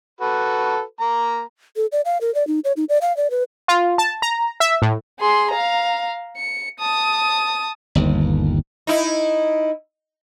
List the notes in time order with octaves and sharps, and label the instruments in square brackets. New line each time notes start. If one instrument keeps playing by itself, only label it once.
[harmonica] F#4 A4 B4
A#3 A#5
[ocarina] A4
D5
F5
A#4
D5
D#4
C#5
D#4
D5
F5
D5
B4
[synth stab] F4
A5
A#5
E5
A2
[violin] G#4 C6
F5 A#5
C#7
A5 D#6
[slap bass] G1 D#2
[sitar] D#4 E4